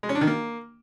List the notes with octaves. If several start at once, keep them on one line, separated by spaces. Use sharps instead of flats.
G#3
C#4
D4
D#3
A#3